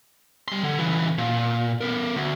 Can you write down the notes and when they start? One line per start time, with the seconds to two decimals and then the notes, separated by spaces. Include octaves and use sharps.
0.48 G3 C6
0.64 D3
0.79 C#3 E3
1.18 A#2
1.81 B3 A#4
2.15 D2